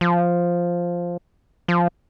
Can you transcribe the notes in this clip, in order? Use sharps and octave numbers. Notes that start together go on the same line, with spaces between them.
F3
F3